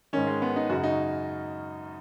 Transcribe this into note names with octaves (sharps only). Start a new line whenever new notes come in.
G#2 D#3 C#4
G#3
B3
D#4
F#2 C#3 F#4
D#4